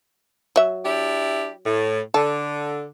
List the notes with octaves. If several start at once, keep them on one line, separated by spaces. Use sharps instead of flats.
F#3 E5
D4 E4 G4
A2
D3 A4